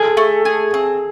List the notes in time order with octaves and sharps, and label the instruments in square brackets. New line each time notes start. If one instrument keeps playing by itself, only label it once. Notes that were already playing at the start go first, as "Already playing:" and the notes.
Already playing: [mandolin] G#4 [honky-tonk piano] A4
[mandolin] A3
G#4
C4